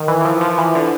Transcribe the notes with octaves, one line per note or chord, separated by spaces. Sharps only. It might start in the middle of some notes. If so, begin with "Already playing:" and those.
Already playing: D#3
E3
E3
F3
F3
E3
D3